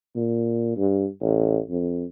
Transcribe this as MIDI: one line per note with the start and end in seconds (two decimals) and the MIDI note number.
0.16 0.76 46
0.77 1.06 43
1.21 1.58 33
1.70 2.04 41